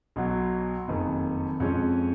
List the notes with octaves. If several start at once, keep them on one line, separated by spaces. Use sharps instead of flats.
B1 B2 F#3
F#1 F2 D#3
F2 F3 G#3 C#4